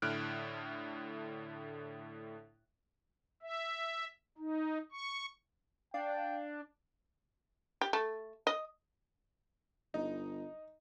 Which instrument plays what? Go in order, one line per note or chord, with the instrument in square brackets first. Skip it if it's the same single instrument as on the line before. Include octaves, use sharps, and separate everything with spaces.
[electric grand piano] A2 D3 E4 F6 F#6 D7
[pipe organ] E5
D#4
C#6
[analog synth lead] D4 [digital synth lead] F5 [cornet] G5
[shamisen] G4
A3
D#5
[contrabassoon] G1 [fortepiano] D#4